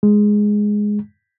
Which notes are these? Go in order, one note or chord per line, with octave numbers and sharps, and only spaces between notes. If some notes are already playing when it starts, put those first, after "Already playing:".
G#3